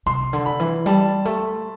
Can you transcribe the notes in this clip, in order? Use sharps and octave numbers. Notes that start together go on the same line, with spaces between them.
C3 C6
D3
B5
E3
G3 A5
A3